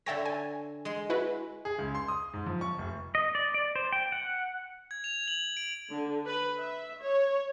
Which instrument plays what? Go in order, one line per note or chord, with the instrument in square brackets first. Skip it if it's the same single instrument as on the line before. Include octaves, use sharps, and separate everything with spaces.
[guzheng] D3 A4 C#5 [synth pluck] E5 G5 A#6
[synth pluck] G#5
[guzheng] G#3 G#4 C6
[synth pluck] E4 F#4 B4
[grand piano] G#4
C#2
C6
D#6
G#2
F3
C#6
F1
[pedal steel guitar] D#5
D5
D5
C5
G5
F#5
[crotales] G#6
F7
F#7
D7
[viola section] D3
B4
E5
C#5